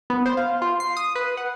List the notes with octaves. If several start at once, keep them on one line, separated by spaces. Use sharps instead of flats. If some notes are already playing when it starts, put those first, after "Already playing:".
B3
C5
F5
F4
C7
D#6
B4
F#5